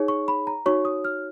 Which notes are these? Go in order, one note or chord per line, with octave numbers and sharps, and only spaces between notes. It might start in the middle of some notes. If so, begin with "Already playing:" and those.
Already playing: D#4 G#4 C#5
C#6
B5
A#5
D#4 F#4 C#5 C#6
D#6
F6